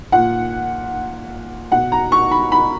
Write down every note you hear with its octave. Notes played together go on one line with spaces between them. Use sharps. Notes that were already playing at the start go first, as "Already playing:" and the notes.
A#2 F#5
B2 F#5
A#5
C#6
B5
B5